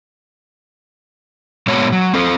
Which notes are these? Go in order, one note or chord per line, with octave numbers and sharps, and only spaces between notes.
A#2 G#3 B3 F#4 C#5
F#3
C4 A4 C5